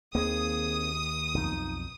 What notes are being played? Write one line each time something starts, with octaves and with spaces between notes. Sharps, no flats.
D#2 A#3 C4 G#4 D#6
B1 F2 D#4